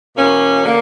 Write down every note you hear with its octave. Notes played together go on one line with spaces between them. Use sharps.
E2 B2 A#3 C#4
D3 A#3